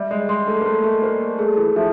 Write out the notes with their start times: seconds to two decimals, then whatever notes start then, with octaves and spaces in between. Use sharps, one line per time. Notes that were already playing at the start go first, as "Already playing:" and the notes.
Already playing: G3 E5
0.11 G#3
0.29 G#3 C6
0.47 A3
0.61 A#3
0.65 A3 C6
0.84 A3
1.02 A#3 C5
1.38 A3 G#4
1.57 E3
1.76 F3 E5